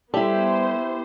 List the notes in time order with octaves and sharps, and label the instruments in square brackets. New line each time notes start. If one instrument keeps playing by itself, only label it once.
[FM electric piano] G3 A4 [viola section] B3 C5 [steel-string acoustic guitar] E4 G4